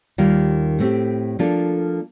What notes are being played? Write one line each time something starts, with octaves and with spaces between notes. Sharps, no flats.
D#2 D#3 G3 A#3 F4
A2 A3 C4 G4
F3 A#3 D4 F4 A4